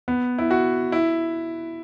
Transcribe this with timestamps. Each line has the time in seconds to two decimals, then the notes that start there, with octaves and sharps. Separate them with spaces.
0.08 B3
0.38 E4
0.51 F#4
0.92 E4